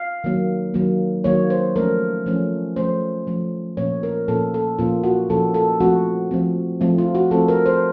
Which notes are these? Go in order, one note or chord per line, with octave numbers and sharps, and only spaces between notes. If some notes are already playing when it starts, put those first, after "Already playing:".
Already playing: F5
D#3 F#3 A#3
D#3 F#3 A#3
D#3 F#3 A#3 C#5
C5
F3 A3 C#4 A#4
F3 A3 C#4
F3 A3 C#4 C5
F3 A3 C#4
A#2 F3 A#3 C#4 C#5
A#4
A#2 F3 A#3 C#4 A4
A4
A#2 F3 A#3 C#4 F4
F#4
A#2 F3 A#3 C#4 A4
A4
F3 A3 C4 F#4
F3 A3 C4
F3 A3 C4
F4
F#4
F3 A3 C4 A4
A#4
C5